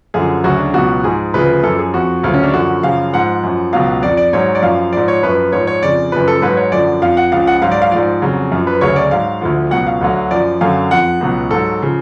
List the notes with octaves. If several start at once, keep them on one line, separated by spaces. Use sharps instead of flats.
F#2 D3 F3 G#4
D2 C#3 F#3 F#4
D4
C#2 B2 F#3 F#4
G#2 F3 G#4
D2 C#3 F3 B4
F#2 F3 A4
G#4
F2 F3 F#4
D2 C#3 F#3 F4
C#4
D4
F#2 D3 F3 F#4
F#2 C#3 F3 F5
G#2 F3 F#5
F#2 F3
C#2 B2 F#3 F5
F2 F3 D5
D5
G#2 F#3 C#5
D5
F#2 F3 F5
G#2 F3 D5
C#5
F#2 F3 B4
G#2 F3 C#5
C#5
F2 C#3 F3 D5
F#2 C#3 F3 B4
A4
G#2 F#3 B4
C#5
F#2 D3 F3 D5
F2 F3 F5
F#5
C#2 C#3 F3 F5
F#5
G#2 F#3 F5
D5
F5
G#2 F3 D5
F2 C#3 F#3
F#2 F3
B4
D2 C#3 F#3 C#5
D5
G#2 F#3 F5
D2 D3 F3
C#2 B2 F#3 F#5
F5
D2 D3 F#3
F#2 F3 D5
F#2 D3 F#3 F5
F2 F3 F#5
C#2 B2 F#3
G#2 F#3 A4
C#3 F3